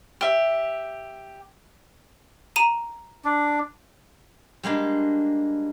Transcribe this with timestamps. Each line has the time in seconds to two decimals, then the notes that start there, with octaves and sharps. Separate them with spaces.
0.21 G4 E5
2.56 A#5 D#7 E7
3.24 D4
4.63 G3 G#3 A#3 D4